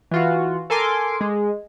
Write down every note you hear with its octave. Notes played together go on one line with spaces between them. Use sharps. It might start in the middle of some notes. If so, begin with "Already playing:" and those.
E3 F4 F#4
A4 A#4 G#5 C6 D6
G#3